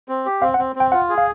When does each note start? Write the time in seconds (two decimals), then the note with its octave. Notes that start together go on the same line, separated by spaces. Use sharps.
0.09 C4
0.26 G4
0.42 C4 F5
0.54 F#5
0.59 C4
0.76 C4 G5
0.92 F4 F#5
1.09 G#4
1.18 F5